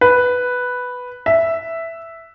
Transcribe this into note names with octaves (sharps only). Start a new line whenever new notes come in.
B4
E5